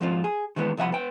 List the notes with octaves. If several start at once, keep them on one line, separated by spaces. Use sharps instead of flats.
F2 G#2 F3 C4 F4
G#4
D#3 E3 G#3 B3
C2 F3 E5 F#5 B5
B3 G5